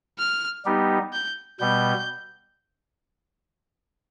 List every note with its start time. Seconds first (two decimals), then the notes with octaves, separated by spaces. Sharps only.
0.19 F6
0.65 G3 B3 D#4 G4
1.13 G6
1.60 B2 G3 B3 G6